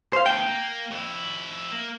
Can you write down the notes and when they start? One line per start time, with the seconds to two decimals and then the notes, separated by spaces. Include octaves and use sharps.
0.13 C5 F5
0.26 D2 B2 G5
0.47 A#3
0.91 F2 E4
1.72 A#3